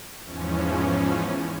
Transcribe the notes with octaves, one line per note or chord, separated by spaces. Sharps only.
E2 G#2 E3 F3 C#4